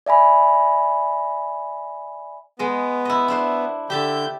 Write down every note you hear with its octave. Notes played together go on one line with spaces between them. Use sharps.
D5 E5 G#5 B5
G#3 B3 D#5
E4 D#5
D4 E4 C5
D3 G4 E5 A5 G6